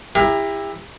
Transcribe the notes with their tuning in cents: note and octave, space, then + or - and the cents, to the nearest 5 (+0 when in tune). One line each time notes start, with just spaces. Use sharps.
E4 +0 G4 +35 A#4 +0